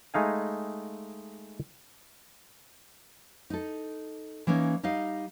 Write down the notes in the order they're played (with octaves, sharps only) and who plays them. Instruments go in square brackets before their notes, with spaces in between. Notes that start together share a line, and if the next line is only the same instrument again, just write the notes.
[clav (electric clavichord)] G#3 A3 D#4 F5 G#5
[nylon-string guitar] D#4 A4
E3 A#3 C#4 D#4
G3 D#4 D#5 F5